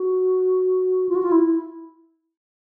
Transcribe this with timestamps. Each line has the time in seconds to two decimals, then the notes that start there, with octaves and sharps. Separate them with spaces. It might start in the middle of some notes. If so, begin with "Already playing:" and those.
Already playing: F#4
1.09 F4
1.15 F#4
1.22 F4
1.32 E4